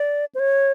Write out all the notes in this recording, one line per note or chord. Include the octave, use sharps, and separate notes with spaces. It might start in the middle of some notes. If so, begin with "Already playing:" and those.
Already playing: D5
C5
C#5